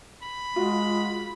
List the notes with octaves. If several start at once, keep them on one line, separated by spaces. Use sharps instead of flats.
B5
G#3 F4 F#4